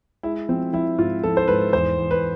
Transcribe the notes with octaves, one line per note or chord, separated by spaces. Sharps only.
G#3 E4
F3 C4
F3 E4
G#2 F4
F3 A4
C5
G#2 B4
E2 C5
E2
B4